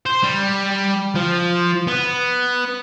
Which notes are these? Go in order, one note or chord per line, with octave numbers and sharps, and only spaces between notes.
C5
G3
F3
B3